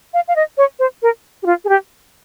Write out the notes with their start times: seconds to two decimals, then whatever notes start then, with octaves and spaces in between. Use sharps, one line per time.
0.14 F5
0.28 F5
0.36 D#5
0.57 C#5
0.79 C5
1.02 A#4
1.43 G4
1.46 F4
1.64 G#4
1.69 G4